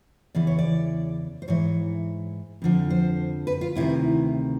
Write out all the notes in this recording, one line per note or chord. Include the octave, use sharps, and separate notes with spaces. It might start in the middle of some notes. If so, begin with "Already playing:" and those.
E2 C#3 E3 D5
C#5
D5
C5
G#2 E3 C#5
F2 D3 F3
C5
B4
F4
D2 C3 D#3 E4